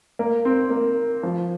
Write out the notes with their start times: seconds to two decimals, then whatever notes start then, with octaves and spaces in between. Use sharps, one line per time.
0.19 A#3
0.45 C4
0.70 A#3
1.23 F3